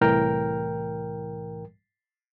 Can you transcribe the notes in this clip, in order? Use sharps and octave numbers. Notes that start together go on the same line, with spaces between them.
C2 A2 E3 A#4 G5 F6